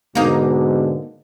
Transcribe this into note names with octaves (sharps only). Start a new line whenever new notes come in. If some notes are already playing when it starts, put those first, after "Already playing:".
G#2 B2 D3 A#3 D#4